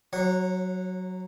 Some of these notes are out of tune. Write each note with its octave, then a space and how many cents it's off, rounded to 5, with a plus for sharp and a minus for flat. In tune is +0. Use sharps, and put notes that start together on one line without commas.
F#3 +0 C#5 -35 F#5 -15